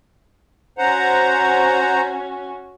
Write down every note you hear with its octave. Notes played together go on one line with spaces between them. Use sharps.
C#4 F#4 C5 F#5 A#5